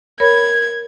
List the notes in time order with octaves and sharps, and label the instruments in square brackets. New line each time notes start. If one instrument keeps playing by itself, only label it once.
[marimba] A#4 C#5 B5 [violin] G#6